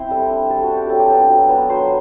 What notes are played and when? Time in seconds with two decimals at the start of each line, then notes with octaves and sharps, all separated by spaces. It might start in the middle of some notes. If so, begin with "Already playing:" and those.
Already playing: C4 E4 C5 E5
0.10 G3 A4
0.30 D4
0.50 G3 A4
0.63 F#4
0.70 D4
0.77 G4
0.90 F#3 A4
0.99 G4
1.10 B3 D4 A4
1.29 F#3
1.49 B3 D4
1.70 F#3 C5